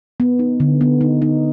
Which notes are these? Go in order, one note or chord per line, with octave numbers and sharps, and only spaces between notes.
B3
D#4
D3
B3
D#4
D#4